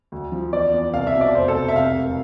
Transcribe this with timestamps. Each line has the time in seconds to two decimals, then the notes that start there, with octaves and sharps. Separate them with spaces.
0.12 D2
0.32 F3
0.53 E2 D5
0.73 E2
0.94 C2 F5
1.07 E5
1.14 B2
1.21 D5
1.34 F1 C5
1.48 A4
1.55 F1
1.68 E5
1.76 C3 F5
1.96 E1